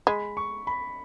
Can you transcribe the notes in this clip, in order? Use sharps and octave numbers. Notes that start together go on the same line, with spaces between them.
G#3 B5
C#6
B5